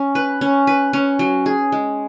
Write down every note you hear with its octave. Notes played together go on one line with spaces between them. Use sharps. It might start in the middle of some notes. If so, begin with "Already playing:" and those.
Already playing: C#4
B4
C#4
B4
C#4
F#3
G#4
G#3